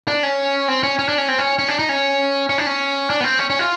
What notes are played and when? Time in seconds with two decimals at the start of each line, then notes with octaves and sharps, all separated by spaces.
0.08 D4
0.23 C#4
0.68 C4
0.83 C#4
0.99 C#4
1.08 D4
1.18 C#4
1.28 C4
1.39 C#4
1.59 C#4
1.68 D4
1.79 D#4
1.89 C#4
2.49 C#4
2.58 D4
2.66 C#4
3.10 D4
3.21 B3
3.24 C4
3.39 C#4
3.50 C#4
3.59 F4